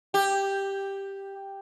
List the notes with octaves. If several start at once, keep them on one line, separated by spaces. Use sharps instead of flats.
G4